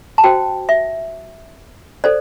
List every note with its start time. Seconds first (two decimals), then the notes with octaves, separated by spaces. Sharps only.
0.18 A5
0.24 F#4 C5 G5
0.69 E5
2.04 A4 C5 D5